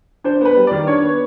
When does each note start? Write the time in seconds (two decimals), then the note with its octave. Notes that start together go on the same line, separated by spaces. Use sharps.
0.24 D4 C5
0.41 B3 B4
0.56 G3
0.67 D#3 D5
0.87 D4 C#5
1.03 B3